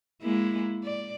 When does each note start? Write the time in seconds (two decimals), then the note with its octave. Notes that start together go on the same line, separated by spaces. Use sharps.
0.22 G#3 A#3 E4
0.84 D5